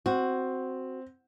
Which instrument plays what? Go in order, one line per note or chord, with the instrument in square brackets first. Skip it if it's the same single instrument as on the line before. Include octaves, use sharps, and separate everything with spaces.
[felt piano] C4 [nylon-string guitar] F#4